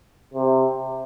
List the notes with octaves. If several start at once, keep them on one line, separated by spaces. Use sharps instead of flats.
C3